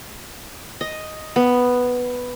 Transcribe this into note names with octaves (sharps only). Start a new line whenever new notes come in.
D#5
B3